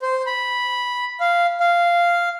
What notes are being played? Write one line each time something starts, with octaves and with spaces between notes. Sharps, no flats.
C5
B5
F5
F5